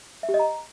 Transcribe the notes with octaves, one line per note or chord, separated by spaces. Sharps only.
E5
G4
D#5
A#5